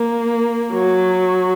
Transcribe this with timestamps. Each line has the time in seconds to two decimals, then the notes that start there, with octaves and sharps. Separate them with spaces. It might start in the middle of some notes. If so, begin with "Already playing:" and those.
Already playing: A#3
0.73 F#3